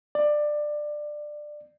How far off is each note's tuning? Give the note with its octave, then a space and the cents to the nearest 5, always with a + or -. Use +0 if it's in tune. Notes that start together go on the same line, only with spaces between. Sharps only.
D5 +20